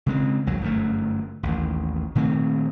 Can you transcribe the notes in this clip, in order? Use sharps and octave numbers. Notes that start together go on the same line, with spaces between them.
C#3 G#3 C4
A#1 D#2 F#3
G1 F#2 C#3 A3
A1 D#2
A#2 D#3 A3 C4